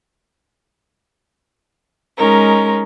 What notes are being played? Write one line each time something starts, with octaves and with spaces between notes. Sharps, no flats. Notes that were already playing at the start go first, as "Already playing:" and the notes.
G#3 C#4 D#4 A#4